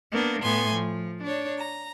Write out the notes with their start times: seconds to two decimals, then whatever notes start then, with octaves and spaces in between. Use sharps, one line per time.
0.12 A#3 B3 D4
0.42 A2 B3 G#5 C6
0.74 F3
1.22 D4 C#5
1.58 A#5